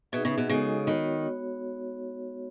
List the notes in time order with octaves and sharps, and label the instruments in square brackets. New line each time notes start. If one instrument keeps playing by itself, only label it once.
[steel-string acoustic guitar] B2 [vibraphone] D#4 G#4 B4 E5
[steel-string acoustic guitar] C#3
B2
[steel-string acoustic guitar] C#3 [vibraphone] G#3 D#4 F#4 A4 D#5
[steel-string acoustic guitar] D#3 [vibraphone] B3 F#4 C#5